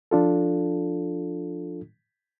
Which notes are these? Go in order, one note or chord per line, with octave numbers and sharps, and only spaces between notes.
F3 D4 F4 A4